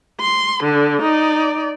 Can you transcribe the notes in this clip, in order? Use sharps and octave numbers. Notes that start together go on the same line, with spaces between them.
C6
D3
D#4 D5